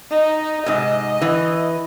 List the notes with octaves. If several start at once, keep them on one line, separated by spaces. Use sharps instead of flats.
D#4
G#2 C3 D#5
E3